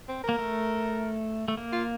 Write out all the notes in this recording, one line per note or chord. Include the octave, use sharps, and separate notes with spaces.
C4
A#4
A#3
A3
A3
A#3
F4